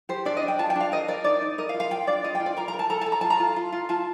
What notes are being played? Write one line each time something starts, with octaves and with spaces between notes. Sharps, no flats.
G4 C5
D4 D5
D#5
D4
G5
F4 A5
G5
D4 F5
A#4 D#5
A#4 D5
D#4 D5
D#4
A#4 D#5
F5
F4
F5
F4 G5
D4 D5
F4 D#5
G5
F4
D5
A#4 A#5
A#5
A#4
A5
A4 A#5
A5
A4
A#5
F4 A5
A#5
F4
F4
F4
F4 A5